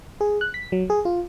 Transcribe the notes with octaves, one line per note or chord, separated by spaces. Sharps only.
G#4
F#6
B6
F#3
G#4
F4